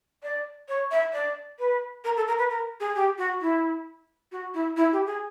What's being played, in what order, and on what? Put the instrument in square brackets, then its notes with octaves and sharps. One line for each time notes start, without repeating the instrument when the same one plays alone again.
[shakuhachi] D5
C#5
E5
D5
B4
A#4
A4
A#4
B4
A#4
G#4
G4
F#4
E4
F#4
E4
E4
G4
G#4